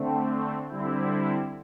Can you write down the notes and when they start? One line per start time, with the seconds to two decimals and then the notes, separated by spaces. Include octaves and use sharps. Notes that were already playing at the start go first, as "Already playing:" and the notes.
Already playing: D3 A3 C4
0.69 D3 G3 C4 E4